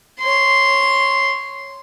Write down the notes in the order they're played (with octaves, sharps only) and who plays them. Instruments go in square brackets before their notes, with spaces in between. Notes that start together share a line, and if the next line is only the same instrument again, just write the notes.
[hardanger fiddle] C#5 C6